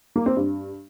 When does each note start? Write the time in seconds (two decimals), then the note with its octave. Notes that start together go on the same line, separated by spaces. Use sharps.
0.16 A#3
0.26 C4
0.37 G2